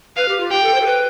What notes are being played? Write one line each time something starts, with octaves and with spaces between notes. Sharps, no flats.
B4 F5
G4
F4
G4 G5
A4
C5
A4
B4